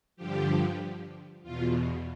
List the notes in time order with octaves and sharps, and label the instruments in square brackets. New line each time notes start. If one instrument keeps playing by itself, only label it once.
[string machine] G2 D3 F3 G4
E2 B2 F4